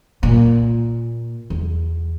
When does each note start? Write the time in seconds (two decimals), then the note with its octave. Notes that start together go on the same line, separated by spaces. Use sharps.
0.23 A#2
1.50 E2